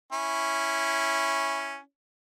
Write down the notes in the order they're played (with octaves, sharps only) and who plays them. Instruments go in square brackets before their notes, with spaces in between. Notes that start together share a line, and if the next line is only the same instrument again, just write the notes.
[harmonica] C#4 E4